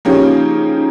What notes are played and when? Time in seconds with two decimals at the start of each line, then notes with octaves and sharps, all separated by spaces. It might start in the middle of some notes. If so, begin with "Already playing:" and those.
0.05 C#3 F3 A#3 C#4 D#4 G4
0.76 D#4